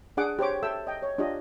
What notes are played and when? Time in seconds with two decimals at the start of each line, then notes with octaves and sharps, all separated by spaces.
0.17 D4 G#4 F#5 D6
0.39 G4 C5 C#5 D6
0.63 A4 E5 G5 E6
0.87 D#5 G5
1.03 C#5
1.18 D4 F4 G4 D#5